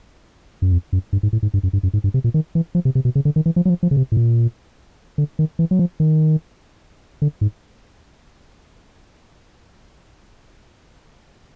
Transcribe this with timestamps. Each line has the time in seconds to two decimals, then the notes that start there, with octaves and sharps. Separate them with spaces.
0.62 F#2
0.72 F2
0.93 F#2
1.13 G2
1.23 G#2
1.33 A2
1.43 G#2
1.54 G2
1.63 F#2
1.73 G2
1.83 F#2
1.93 G#2
2.04 G2
2.14 C3
2.24 A#2
2.34 D#3
2.55 E3
2.75 F3
2.85 C3
2.95 C3
3.05 B2
3.15 C#3
3.25 D3
3.36 D#3
3.46 E3
3.56 F3
3.65 F#3
3.69 F3
3.83 F3
3.91 C#3
3.97 C3
4.12 A2
4.17 A#2
5.18 D3
5.39 D#3
5.59 E3
5.71 F#3
5.79 F3
6.00 D#3
7.22 D3
7.41 G#2